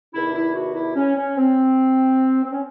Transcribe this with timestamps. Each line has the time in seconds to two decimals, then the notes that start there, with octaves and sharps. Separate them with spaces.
0.12 E2 C3 D#3 E4
0.33 E4
0.54 F#4
0.75 E4
0.95 C#4
1.16 C#4
1.37 C4
2.43 C4
2.51 C#4